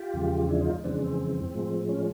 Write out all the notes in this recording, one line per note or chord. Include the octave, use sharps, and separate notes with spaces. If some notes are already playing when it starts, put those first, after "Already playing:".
Already playing: F4 G4
E2 C#3 F3 G#3
D4 E4
D#4 F4
F2 C#3 E3 G#3 C4 D4
C4
A2 F3 G#3
C#4